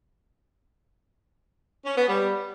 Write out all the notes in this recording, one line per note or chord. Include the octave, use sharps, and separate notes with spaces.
C#4
B3
G3